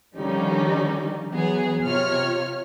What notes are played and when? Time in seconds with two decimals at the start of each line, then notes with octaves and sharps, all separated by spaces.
0.17 D3 D#3 F3 G3 C#4 D#4
1.30 E3 F#3 B3 G#4
1.84 C3 F4 C#5 F6